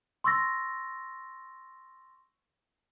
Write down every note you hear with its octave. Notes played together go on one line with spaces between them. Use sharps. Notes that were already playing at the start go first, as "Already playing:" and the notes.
C6 C#6 E6 A6 A#6